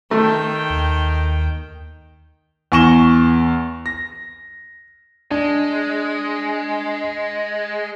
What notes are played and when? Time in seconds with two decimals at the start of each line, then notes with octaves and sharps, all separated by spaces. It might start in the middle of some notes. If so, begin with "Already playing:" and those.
0.11 D#3 A3 G5
0.70 D#2
2.72 E2 G#5 C#6 A#6 E7 G7
3.86 A#6
5.31 G#3 D4